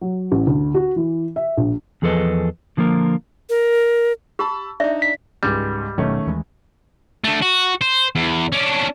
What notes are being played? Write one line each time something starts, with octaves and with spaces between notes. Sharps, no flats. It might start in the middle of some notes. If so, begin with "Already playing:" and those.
F#3
A1
D2
F#4
E3
E5
A#1
E2 F3 G#4 A4 B4 D#5
D3 F3 A#3 F4 A#4
A#4
G4 A5 B5 E6
D4 D#4 D5 E5
B6
C#2 G#2 G3
E1 B2 D#3 F#3 A3 C#4
D#2 E3 G#3
D3 A3
F#4
C5
E2
C#4 D4